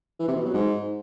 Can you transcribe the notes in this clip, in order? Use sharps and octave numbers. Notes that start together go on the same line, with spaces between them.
E3
C3
B2
F#3
G#2